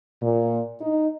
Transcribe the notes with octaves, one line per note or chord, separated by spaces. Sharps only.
A#2
D#4